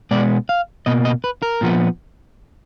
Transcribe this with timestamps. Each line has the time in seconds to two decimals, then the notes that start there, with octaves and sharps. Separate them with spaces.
0.11 B2 G#3 B3 D5
0.49 F5
0.86 B2 A#3 D#5
1.05 D#5
1.24 B4
1.42 A#4
1.61 A#2 F3 B3